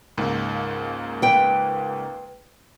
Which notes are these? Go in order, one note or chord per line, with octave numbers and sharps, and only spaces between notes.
C#2 G#2 A#3
B4 G5